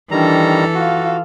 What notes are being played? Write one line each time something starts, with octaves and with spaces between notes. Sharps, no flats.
D#3 E3 G3 D4 A4 A#5
F4 F#4 F5